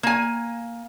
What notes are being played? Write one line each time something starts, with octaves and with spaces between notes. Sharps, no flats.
A#3 G#5